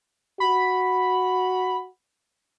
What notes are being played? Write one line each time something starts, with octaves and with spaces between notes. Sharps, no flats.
F#4 B5